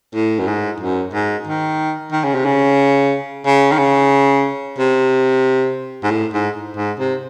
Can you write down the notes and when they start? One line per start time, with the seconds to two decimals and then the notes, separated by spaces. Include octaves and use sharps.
0.14 A2
0.39 F#2
0.47 G#2
0.80 F#2
1.13 G#2
1.47 D#3
2.12 D#3
2.24 C#3
2.35 C3
2.45 C#3
3.46 C#3
3.72 D#3
3.78 C#3
4.78 C3
6.04 G#2
6.11 A2
6.33 G#2
6.77 G#2
6.99 C3